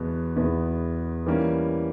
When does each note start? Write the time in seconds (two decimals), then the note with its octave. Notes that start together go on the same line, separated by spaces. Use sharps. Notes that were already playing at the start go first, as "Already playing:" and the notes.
Already playing: E2 B2 G#3 B3
0.36 E2 B2 G#3 B3
1.26 E3 G3 A#3 C#4